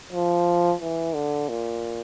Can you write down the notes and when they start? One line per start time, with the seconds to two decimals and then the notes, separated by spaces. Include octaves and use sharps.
0.12 F3
0.82 E3
1.15 D3
1.49 A#2